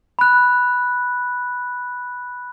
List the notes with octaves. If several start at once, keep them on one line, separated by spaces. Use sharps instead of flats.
B5 F#6